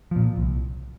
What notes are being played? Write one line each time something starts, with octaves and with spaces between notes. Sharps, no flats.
A#2 F3
C2